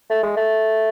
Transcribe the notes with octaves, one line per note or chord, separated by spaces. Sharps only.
A3
G#3
A3